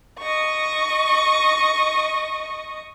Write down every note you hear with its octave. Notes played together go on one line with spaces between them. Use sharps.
D#5 C#6